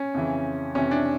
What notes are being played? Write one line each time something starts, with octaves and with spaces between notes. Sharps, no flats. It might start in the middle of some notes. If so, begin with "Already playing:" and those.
Already playing: C#4
F2 C#3 E3
F2 C3 E3 C#4
D4